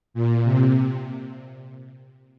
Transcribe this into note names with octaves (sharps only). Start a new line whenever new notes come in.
A#2
C3